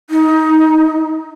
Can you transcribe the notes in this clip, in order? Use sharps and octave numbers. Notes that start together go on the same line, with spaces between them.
D#4